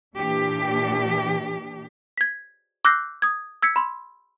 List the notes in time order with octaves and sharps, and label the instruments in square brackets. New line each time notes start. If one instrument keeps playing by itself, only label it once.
[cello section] A#2 E3 D4 G4
[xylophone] G#6 B6
D6 E6 F#6 G6 A#6 C7
D#6 G#6
E6 G#6 B6 C#7
B5 C6